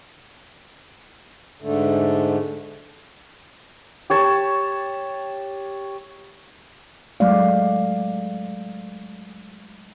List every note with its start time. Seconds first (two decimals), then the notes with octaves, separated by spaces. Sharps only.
1.62 G#2 D3 A3
4.10 G4 C#5 A5
7.20 F#3 G#3 A3 D5 F5